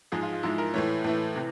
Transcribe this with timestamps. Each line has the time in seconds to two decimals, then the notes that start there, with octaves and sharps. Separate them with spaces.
0.12 G#2 F3 G#3 G#4
0.23 F4
0.33 F4
0.43 G#2 F3 G#3 E4
0.58 A#4
0.74 A2 E3 A3 C#5
1.04 A2 E3 A3
1.36 C3 E3